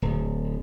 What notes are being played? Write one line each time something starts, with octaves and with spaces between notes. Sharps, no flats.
D1